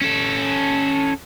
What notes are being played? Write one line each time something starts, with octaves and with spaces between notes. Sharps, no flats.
C#4 A4